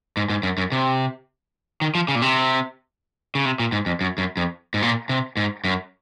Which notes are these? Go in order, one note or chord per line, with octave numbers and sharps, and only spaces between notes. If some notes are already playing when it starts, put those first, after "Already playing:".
G#2
G#2
F#2
F#2
C3
D#3
F3
C#3
A#2
C3
C#3
C3
A#2
G#2
F2
F#2
F#2
F2
G#2
A#2
C3
G#2
F#2